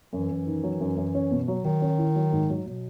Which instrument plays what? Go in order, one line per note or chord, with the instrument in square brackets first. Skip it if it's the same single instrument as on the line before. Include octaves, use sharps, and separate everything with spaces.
[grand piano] F#2 [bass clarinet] E3
[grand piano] F#2
D#3
F#3
F#2
F#2
C#4
B2
F#3
[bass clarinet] D#3 [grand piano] F#3
[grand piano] C#4
E4
F#3
G#2
F#3
[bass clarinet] B2 [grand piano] F#3